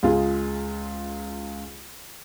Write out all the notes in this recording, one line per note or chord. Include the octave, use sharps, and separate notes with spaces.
C#2 G#3 F4 G#4